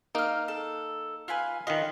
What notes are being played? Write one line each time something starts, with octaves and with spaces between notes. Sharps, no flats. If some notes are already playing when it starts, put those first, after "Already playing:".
A#3 D#4 A#4 F6
A4
F4 B4 G#5
D#3 F4 B4 D#5